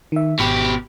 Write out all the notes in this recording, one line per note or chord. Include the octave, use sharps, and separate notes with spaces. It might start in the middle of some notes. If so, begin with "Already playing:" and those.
D#3 E5
G#1 B2 G4 B5